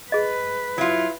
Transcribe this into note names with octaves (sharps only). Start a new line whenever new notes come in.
G#4 B4 D#5
F#3 E4 F4